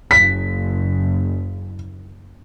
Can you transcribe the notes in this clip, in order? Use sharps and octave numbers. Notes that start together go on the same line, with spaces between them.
F#1 B6